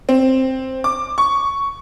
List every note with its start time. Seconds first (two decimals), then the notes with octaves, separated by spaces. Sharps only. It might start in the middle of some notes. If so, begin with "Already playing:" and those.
0.09 C4
0.84 D6
1.18 C#6